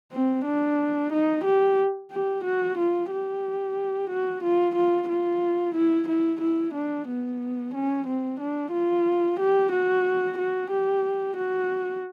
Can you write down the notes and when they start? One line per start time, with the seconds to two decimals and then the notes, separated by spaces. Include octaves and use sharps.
0.13 C4
0.45 D4
1.13 D#4
1.45 G4
2.11 G4
2.44 F#4
2.78 F4
3.11 G4
4.10 F#4
4.43 F4
4.75 F4
5.09 F4
5.75 E4
6.08 E4
6.41 E4
6.74 D4
7.08 B3
7.74 C#4
8.07 C4
8.40 D4
8.72 F4
9.40 G4
9.72 F#4
10.38 F#4
10.71 G4
11.37 F#4